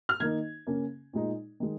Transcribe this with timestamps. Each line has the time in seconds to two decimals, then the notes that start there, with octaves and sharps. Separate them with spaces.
0.09 F6
0.20 D#3 A#3 D#4 G#6
0.67 C#3 A#3 C#4
1.13 A#2 G#3 D#4
1.60 D#3 G#3